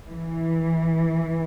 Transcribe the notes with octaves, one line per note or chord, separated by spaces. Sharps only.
E3